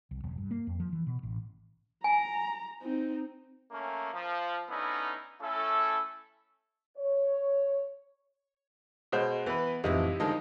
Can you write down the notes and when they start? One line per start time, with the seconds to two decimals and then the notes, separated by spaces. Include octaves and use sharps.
0.11 C2
0.24 E1
0.38 G2
0.51 A#3
0.67 F2
0.80 F3
0.93 E3
1.07 B2
1.23 A1
2.04 G#5 A#5
2.82 C4 D#4
3.71 A3 A#3 C#4
4.13 F3
4.69 D3 B3 C#4 D#4 E4
5.40 A3 C#4 E4 A4
6.98 C#5
9.12 B2 G#3 C5
9.46 E3 B3 B4
9.84 F2 A2 C3 E3 D#4 E4
10.20 D3 D#3 F3 G#3 D#4 G4